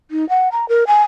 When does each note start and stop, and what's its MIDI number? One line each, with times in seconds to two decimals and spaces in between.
0.11 0.28 63
0.29 0.49 78
0.52 0.68 82
0.69 0.84 70
0.87 1.02 80